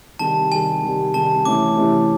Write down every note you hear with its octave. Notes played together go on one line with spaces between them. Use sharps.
C3 D#3 G3 A5
C3 D#3 G3 G#5
C3 D#3 G3
C3 D#3 G3 A5
C3 E3 A3 C#4 E4 D6
C3 E3 A3 C#4 E4